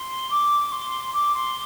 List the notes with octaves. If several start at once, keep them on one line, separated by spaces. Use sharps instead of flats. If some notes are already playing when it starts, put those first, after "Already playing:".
Already playing: C6
D6
C6
D6
C6